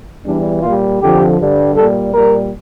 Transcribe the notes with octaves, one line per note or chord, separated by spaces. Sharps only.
E2 E3 G3 D4
A#2 G3 F4
F2 D3 F3 G4
G2 D3 G3
A#2 G3 A4
A#2 G3 A#4